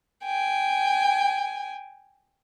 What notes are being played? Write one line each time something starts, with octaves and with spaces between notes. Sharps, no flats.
G5 G#5